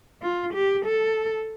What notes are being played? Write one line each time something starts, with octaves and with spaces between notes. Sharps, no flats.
F4
G4
A4